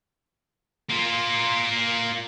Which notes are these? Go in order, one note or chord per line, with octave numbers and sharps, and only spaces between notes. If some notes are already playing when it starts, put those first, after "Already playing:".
A#3 F4